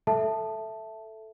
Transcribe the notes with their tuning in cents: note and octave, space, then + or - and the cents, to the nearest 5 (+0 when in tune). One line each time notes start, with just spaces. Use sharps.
A4 +0 E5 +0 A5 +0